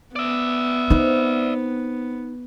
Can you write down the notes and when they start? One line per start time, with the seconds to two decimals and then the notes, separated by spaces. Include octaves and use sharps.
0.16 B3 D5 E5
0.90 C4 D#4 B4